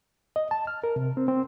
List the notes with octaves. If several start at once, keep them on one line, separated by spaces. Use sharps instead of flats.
D#5
A5
F6
A#4
C3
C4
C4